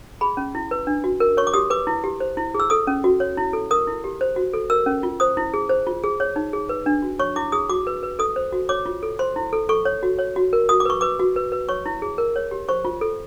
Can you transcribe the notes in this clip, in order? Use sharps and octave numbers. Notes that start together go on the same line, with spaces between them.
G#4 B5
C#4
E4
B4
D4
F#4
A#4
C#5 C#6
D6
G4 D#6
B4 D6
E4
G4
C5
E4
G#4
E6
A4 D#6
C#4
F#4
C#5
E4
A4
A#4 D#6
E4
G4
C5
F#4
A4
A#4 E6
C#4
F4
C5 D#6
E4
G#4
C5
F4
G#4
C#5
D#4
G#4
B4
D4
F#4
C#5 C#6
E4 D6
G#4 D#6
F#4 D6
B4
B4
A4 D#6
C5
F#4
C#5 D6
F4
A4
C5 C6
E4
A4
A4 C#6
C#5
F#4
C#5
F#4
A#4
F#4 D#6
D6
B4 C#6
B4 D6
F#4
B4
B4
C#5 C#6
E4
G#4
A#4
C#5
G4
C5 C#6
F4
A4